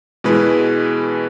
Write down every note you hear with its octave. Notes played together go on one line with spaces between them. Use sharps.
B2 E3 G#3 B4